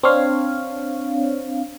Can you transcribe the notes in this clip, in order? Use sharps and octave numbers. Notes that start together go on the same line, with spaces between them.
C4 D4 C#5 F5